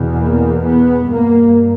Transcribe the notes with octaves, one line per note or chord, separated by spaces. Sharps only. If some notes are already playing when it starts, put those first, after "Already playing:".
Already playing: E2 B2
A#3
B3
G2 A#3